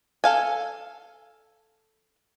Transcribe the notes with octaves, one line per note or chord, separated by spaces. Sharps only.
A4 F5 G#5